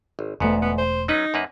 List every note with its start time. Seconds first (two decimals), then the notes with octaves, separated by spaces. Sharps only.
0.19 G#1
0.40 E1 D2 G#2 A3 B3
0.62 B3
0.78 C5
1.08 F#3 C#4 D#4 B4
1.34 F#2 A#3 B4